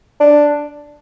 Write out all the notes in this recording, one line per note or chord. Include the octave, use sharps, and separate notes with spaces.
D4